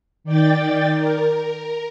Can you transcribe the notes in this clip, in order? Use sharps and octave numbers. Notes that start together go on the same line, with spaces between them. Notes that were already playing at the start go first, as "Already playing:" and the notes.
D#3 D5 G5 A6
A#4